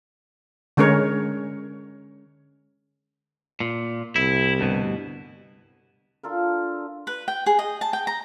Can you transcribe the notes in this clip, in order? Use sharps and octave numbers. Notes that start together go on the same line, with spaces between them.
D3 G#3 C#4 A#4 C#5
A#2
C2 E4
D2 G2 B2
D4 F4 A4 A#4
B4
G5
G#4
D#5
A5
G5
A#5